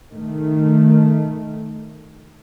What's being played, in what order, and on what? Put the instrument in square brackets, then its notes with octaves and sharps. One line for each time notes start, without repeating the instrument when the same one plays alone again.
[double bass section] D#3 A3